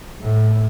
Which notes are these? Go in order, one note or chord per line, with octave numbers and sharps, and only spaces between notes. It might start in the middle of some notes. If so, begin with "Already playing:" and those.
A2